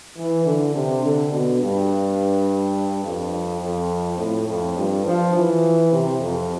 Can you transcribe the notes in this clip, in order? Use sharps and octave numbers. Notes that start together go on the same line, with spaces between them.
E3
D3
C3
D3
B2
G2
F2
F2
A2
F2
G2
F3
E3
C3
F2